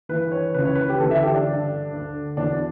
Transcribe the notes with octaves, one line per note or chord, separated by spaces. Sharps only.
G2 E3 B4
C#5
C#2 C#3 E3 B4
C#5
B4
G4
D2 C#3 E3 A4
E5
G4
D4
G2 D3
D2 D3
E2 B2 D4